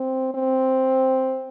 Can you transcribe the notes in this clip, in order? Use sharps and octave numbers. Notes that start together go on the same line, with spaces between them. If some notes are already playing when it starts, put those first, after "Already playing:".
Already playing: C4
C4